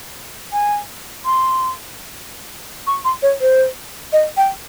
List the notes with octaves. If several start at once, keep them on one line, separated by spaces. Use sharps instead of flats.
G#5
C6
C#6
C6
C#5
C5
D#5
G5